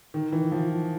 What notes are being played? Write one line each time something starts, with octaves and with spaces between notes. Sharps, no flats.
D#3
E3
F3